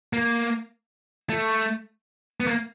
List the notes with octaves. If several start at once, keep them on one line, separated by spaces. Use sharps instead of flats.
A#3
A3
B3
A#3